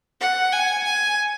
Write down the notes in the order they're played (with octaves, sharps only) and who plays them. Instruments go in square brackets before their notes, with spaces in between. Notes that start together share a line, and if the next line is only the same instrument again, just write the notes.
[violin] F#5
G#5
G#5